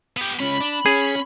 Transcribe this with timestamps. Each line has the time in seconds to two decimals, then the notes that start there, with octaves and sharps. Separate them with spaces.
0.17 B3 G4
0.40 C#2 C#4 B5
0.60 D4
0.86 C#4 G#4